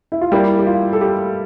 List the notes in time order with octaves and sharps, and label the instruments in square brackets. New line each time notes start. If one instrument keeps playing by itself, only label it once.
[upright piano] E4
F4
[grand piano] G3 A#3 E4 [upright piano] G4
[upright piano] G4
F4
A4
G4